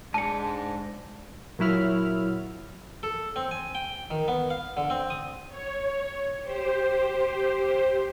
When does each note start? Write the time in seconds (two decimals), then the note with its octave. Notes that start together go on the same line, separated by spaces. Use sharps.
0.14 G#2 D4 G#4 A5 C#7
1.59 A#2 F#3 E4 F6
3.03 A4
3.36 C4
3.51 G#5
3.75 G5
4.11 D#3
4.28 B3
4.50 F5
4.77 D3
4.90 C4
5.10 D#6
5.49 C#5
6.42 G4 C5